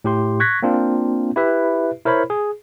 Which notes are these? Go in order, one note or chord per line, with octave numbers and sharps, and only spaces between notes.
A2 G4 C6
C#6 F#6 G#6 A#6 B6
A#3 C4 D4 F4
E4 G4 B4 E5
E4 A#4 C5 C#5 B5
G#4